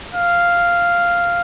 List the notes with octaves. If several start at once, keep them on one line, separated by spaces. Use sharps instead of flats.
F5